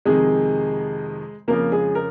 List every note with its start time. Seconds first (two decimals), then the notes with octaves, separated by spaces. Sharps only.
0.05 F2 C3 D#3 G#3 G#4
1.48 F2 C#3 F3 A#3 A#4
1.72 G#3 G#4
1.95 A#4